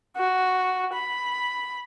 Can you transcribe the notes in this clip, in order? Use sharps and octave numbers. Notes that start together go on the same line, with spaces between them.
F#4
B5